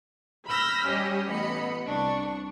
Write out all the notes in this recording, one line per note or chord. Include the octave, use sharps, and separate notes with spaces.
B5 E6 F6 G6 A#6 B6
G3 C#4 G4 C#5 D#5
A1 B3 D#5 B5 C#7
C2 D4 C#6